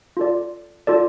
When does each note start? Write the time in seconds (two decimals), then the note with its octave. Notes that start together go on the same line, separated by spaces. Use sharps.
0.17 F4 A4 D5
0.87 F4 A4 D5